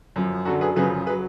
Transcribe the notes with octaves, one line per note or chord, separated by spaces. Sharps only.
F#2 F3
F#2 D3 F#3 F#4 A4
G#4 B4
F#2 C#3 F3 G#4 B4
G#4 B4
F#3